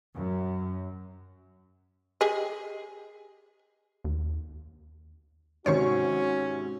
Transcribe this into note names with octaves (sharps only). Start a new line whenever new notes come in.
F#2
G4 G#4 D#5
D#2
G#2 C3 D#3 C#4 F#4 C5 C#5 C#6